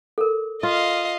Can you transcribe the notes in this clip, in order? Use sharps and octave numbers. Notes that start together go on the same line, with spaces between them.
A4 A#4
F4 D#5 F5